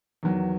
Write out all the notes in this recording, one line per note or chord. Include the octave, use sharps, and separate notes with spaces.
E2 D#3 F#3